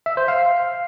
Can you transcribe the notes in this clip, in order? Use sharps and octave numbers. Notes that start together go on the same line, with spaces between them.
E5
C5
F5